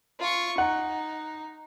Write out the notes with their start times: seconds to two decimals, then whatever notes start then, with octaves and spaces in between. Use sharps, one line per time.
0.20 F4 C#6
0.58 D#4 F#5